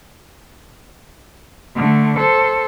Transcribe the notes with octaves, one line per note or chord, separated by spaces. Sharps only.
D3 A3
A4 C5